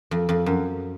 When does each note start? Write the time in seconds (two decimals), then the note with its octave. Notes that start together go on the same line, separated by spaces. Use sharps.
0.11 F2
0.29 F2
0.46 F#2